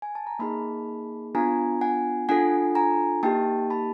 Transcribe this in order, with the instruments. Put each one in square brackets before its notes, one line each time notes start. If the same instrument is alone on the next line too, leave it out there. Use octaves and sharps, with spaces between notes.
[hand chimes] G#5
A5
A#5
A#3 D#4 G#4 A5 B5
B3 D4 F4 G#5 A#5
F#5 G#5
D4 F4 A4 F#5 G#5
G#5 A#5
A#3 D#4 G4 G5 A5
A5 B5